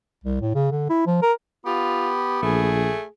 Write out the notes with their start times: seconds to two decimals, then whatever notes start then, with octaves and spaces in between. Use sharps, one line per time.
0.24 C2
0.41 A2
0.55 C#3
0.71 D3
0.90 E4
1.07 F3
1.22 A#4
1.66 B3 F4 G4
2.42 A#1 A3 G#4